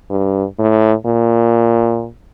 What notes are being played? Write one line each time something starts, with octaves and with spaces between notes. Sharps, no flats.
G2
A2
A#2